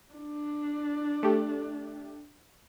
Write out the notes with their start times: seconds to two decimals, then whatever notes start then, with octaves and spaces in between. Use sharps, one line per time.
0.13 D4
1.23 A3 G4